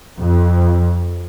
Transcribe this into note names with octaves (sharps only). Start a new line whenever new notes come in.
F2